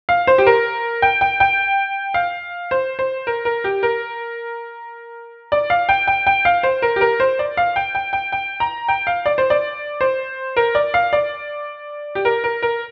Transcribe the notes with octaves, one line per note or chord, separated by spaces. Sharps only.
F5
C5
G4
A#4
G5
G5
G5
F5
C5
C5
A#4
A#4
G4
A#4
D5
F5
G5
G5
G5
F5
C5
A#4
G4
A#4
C5
D5
F5
G5
G5
G5
G5
A#5
G5
F5
D5
C5
D5
C5
A#4
D5
F5
D5
G4
A#4
A#4
A#4